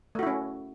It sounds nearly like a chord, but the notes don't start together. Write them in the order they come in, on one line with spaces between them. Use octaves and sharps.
A3 F#4 E4 C#4